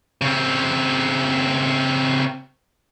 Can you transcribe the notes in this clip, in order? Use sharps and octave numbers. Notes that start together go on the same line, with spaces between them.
C#3 C4